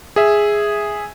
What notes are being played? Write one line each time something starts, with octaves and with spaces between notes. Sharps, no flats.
G#4 E5